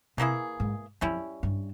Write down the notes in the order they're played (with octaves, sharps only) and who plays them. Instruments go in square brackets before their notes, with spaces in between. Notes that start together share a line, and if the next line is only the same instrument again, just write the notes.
[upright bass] C3 [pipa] E3 A#3 E4 G#4
[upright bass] G#2
[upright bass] F2 [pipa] G3 C#4 E4
[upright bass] G2